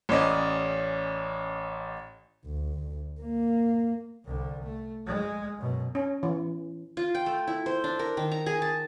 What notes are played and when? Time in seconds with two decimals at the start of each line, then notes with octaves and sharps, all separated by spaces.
0.09 A1 C#4 D5 D#5
2.46 D2
3.21 A#3
4.25 C2 D3
4.63 A3
5.07 G#3
5.57 F#2 B2
5.95 C#4
6.23 E3
6.97 F4
7.15 G5
7.26 A3
7.47 E4
7.66 C5
7.84 D4
7.99 A#4
8.17 D#3
8.31 A#5
8.46 G#4
8.62 A5